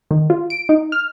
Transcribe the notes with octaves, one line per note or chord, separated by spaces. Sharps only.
D#3
F4
D7
D#4
F6